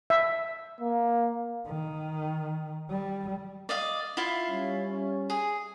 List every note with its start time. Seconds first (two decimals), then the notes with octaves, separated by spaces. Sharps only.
0.10 E5
0.80 A#3
1.66 D#3
2.90 G3
3.69 D5 D#5 F5
4.17 E4 F4 F5
4.49 G3 C#4
5.30 G#4